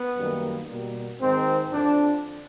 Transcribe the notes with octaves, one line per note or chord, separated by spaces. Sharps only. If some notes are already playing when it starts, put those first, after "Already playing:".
Already playing: B3
F#2 D#3 G3 A#3
B2 G3 A#3
G#2 D#3 G#3 C4
F2 D3 F3 D4